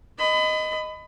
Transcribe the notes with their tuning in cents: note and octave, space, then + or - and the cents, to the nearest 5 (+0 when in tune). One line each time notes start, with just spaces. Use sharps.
D#5 +0 B5 +30